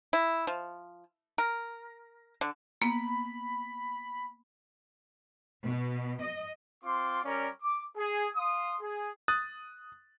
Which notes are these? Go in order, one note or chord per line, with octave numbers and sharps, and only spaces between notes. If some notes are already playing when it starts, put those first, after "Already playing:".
E4
F3
A#4
D3
A#3 B3 B5
B2
D#5
C4 F4 C6 D6
G3 C#4 A#4 D5
D6
G#4
F5 C6 D#6
G#4
D#6 F#6 A6